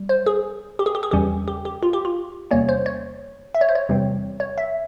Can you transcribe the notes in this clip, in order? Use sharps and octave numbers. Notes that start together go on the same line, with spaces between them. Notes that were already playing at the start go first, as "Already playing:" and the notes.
Already playing: G3
C5
G#4
G4
G#4
G4
G#4
E2 C#3 E3 G3 C#4 G4
G4
G4
F4
G4
F4
E2 C3 G3 A#3 C#4 C#5
C5
C#5
E5
C#5
C5
C#5
E2 C3 E3 G3 C4
C#5
E5